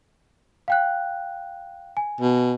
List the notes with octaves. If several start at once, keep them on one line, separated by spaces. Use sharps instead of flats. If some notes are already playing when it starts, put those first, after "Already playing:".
F5 G5 F#6
G#5
B2